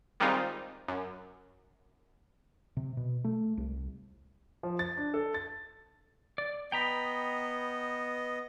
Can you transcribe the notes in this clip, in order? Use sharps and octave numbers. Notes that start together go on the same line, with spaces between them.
D#3 G3 G#3 C4 D#4 F4
F#2
C3
B2
A3
C2
F3
A6
D4
A4
A6
D5
B3 D#5 G5 A#5 B5